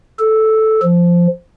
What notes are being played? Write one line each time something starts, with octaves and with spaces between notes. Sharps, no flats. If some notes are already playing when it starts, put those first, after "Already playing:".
A4
F3